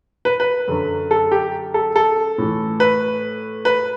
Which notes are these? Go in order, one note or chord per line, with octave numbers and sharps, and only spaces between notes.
B4
B4
F#2 D3 F#3
A4
G4
A4
A4
A2 E3
B4
B4